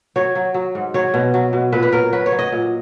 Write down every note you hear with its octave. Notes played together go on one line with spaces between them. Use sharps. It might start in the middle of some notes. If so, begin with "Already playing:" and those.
F#3 C#5
F#3
F#3
G#2
F#3 C#5
B2
F#3
B2
A#2 B4
B4
F#3 A#4
F#3 B4
C#5
F#3
D#5
A#2